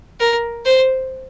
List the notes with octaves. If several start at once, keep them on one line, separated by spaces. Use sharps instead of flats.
A#4
C5